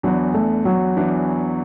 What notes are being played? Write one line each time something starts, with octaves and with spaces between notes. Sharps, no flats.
E2 E3 F#3 B3 D4
A3
F#3
E2 E3 B3 D4